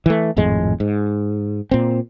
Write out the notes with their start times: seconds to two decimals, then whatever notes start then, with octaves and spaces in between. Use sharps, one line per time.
0.06 E3 A3
0.37 G#1 F2 A2 G#3
0.80 G#2
1.71 A#2 C4